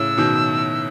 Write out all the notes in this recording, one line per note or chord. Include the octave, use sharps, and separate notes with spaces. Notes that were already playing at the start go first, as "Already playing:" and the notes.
Already playing: A2 C#3 E6
B2 D#3